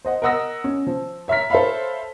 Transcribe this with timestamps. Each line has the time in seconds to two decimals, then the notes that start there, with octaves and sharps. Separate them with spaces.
0.05 C5 D#5 F#5
0.22 A#4 D#5 F#5 D#6 E6 A#6
0.64 C#4
0.87 F3
1.28 C#5 E5 A#5 F6 B6
1.50 A4 C5 C#5 E5 F5 B5